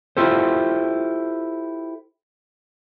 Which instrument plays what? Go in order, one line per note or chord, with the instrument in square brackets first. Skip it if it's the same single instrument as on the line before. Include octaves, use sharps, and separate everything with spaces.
[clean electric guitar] E4 F4 G4 A4 C5